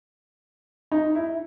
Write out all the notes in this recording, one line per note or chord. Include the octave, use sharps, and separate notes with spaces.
D#4
E4